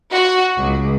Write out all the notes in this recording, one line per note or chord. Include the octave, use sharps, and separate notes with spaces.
F#4
C#2